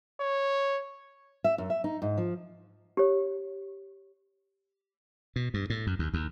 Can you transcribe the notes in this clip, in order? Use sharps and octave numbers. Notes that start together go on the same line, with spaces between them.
C#5
E5
F#2
E5
D#4
G#2
F3
G4 C#5
B2
G2
A2
F#2
D#2
D#2